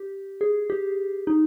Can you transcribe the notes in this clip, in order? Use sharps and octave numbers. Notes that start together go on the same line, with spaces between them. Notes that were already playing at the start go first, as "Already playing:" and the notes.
Already playing: G4
G#4
G4
D#4